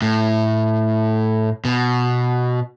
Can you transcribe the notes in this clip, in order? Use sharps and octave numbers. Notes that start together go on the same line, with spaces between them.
A2
B2